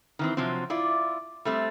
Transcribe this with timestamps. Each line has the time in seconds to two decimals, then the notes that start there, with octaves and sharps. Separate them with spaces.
0.19 D#3 E3 C4
0.37 C3 F3 F#3 C4
0.70 E4 F4 D5
1.45 G3 A3 C4